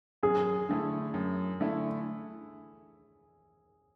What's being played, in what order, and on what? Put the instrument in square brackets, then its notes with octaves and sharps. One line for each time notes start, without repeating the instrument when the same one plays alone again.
[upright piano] F#2 [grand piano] G#4
[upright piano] D3 A3 E4
F#2
D3 A3 E4